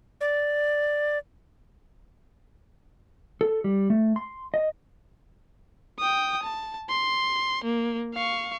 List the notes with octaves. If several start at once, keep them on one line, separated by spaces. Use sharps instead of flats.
D5
A4
G3
A3
C6
D#5
G5 D#6
A5
C6
A#3
F5 C#6